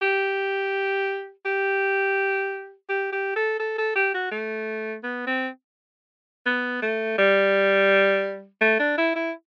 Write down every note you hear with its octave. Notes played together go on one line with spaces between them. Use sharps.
G4
G4
G4
G4
A4
A4
A4
G4
F#4
A3
B3
C4
B3
A3
G3
A3
D4
E4
E4